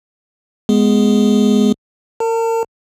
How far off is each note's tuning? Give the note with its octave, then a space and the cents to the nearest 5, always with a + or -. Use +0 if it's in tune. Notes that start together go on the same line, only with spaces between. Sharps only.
G#3 +0 B3 +0 G#4 +0
A#4 -30 A5 +40